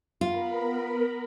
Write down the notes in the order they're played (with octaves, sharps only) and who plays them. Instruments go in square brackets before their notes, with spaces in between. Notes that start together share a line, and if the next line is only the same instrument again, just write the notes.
[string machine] B3 A#4 B5 [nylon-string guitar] F4